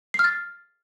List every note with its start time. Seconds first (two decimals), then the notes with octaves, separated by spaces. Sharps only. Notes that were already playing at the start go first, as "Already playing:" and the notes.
0.14 C7
0.19 F6
0.24 A6